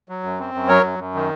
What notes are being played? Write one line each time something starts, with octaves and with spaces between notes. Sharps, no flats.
F#3
F#2
C4
F#2
F#3 A#4 C#5
F#2
F#2
D#3